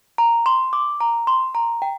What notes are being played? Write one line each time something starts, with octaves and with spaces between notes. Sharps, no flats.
A#5
C6
D6
A#5
C6
A#5
G5